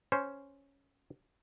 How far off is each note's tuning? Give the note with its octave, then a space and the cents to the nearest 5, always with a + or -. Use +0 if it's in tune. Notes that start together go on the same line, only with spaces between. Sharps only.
C#4 +0 C5 +0